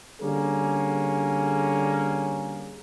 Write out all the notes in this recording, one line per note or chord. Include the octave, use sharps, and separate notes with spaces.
D3 G3 A#3 C#4 G#4